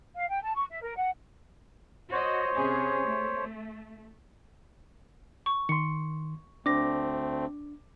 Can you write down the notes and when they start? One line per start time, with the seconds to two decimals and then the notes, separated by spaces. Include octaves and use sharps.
0.16 F5
0.29 G5
0.42 A5
0.56 C#6
0.70 E5
0.82 A#4
0.97 F#5
2.12 F#4 C5 C#5 D#5
2.56 C3 C#4 G#4
3.05 A3
5.46 C#6
5.69 D#3 C6 C#7
6.66 D2 A3 C4 D4 D6 A#6